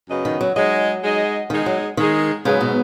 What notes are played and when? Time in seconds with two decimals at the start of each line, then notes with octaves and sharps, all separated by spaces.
0.08 F#2 C#3 B3 F#4 D#5
0.25 D#3
0.41 F#3
0.56 F#3 G#3 D#4 G#4 D#5
1.04 G#3 D#4 G#4 D#5
1.50 D#3 G#3 D#4 G#4
1.66 F#3
1.97 D#3 G#3 D#4 G#4
2.45 G#2 C#3 F#3 B3 G#4 B4
2.61 B2